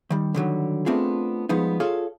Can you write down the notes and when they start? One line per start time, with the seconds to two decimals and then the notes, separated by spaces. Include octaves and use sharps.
0.10 D#3 G3
0.34 D3 D#3 F#3 G3
0.86 A3 B3 C4 D4 F4 G#4
1.49 F3 G3 G#3 B3 D#4
1.80 F4 G#4 A4 C#5 F5